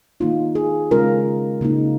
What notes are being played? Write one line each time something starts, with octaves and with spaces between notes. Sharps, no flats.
D#3 A#3 D#4 F4
G#4
C#3 G#3 C#4 F4 A#4
C#3 A#3 D#4